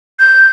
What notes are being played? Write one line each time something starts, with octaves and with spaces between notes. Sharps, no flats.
G6